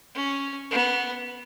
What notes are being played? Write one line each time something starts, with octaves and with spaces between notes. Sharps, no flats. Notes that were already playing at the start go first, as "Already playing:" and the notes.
C#4
B3